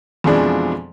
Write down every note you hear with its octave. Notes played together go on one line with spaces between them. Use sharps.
F2 B2 E3 F3 G#3 D4